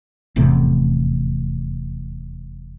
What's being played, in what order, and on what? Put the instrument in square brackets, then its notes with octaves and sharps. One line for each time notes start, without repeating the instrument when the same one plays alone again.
[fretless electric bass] F1 E2 A2 C3